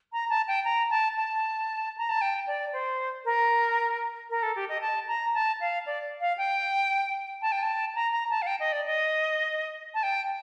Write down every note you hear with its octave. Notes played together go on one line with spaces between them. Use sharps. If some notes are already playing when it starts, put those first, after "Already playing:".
A#5
A5
G5
A#5
A5
A5
A#5
A5
G5
D5
C5
A#4
A#4
A4
G4
D#5
A5
A#5
A5
F5
D5
F5
G5
A5
G5
A5
A#5
A#5
A5
F5
G5
D#5
D5
D#5
A5
G5